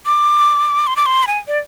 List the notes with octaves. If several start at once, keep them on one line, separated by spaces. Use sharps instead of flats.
D6
C6
D6
C6
B5
G#5
D5